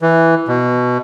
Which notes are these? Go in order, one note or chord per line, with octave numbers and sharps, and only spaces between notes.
E3
B2